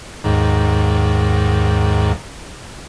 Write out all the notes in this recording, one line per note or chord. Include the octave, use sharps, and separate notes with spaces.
D#2 G#2